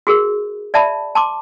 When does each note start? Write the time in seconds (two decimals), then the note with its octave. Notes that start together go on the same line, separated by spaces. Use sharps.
0.07 F#4 G#4 A#4
0.74 D5 E5 A5 B5
1.15 A5 C6 D6